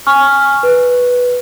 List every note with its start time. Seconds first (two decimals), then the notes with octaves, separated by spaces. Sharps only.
0.07 G#5 C#6 F6
0.63 B4